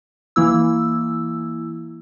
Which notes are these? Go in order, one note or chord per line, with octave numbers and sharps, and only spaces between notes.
E3 A#3 E4 E6